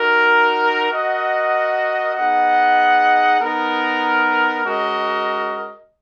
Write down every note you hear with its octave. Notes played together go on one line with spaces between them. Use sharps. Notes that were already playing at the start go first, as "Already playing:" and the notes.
Already playing: D#4 F#4 A#4
F#4 A#4 D#5 F#5
B3 D#4 G#4 D#5 F#5
B3 D#4 A#4
G#3 C#4 F#4 A#4 D#5